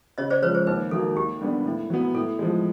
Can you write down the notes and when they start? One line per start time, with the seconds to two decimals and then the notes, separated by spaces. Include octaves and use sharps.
0.18 C#3 C#5 D#5
0.30 C5 D5
0.42 F3 G#3 B4 C#5
0.55 C5
0.67 D#2 B4
0.91 D#3 F#3 A#3 A4
1.16 D#2 G4
1.41 D3 G3 B3 D4
1.65 A2
1.90 F#3 B3
2.14 A2 A4
2.39 F3 G#3